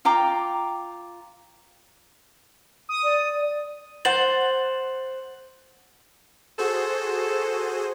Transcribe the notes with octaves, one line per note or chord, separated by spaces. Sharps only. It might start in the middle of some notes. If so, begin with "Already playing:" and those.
F4 G5 A#5 D6
D#6
D5
C5 F#5 A6 F#7
F#4 G#4 A4 C5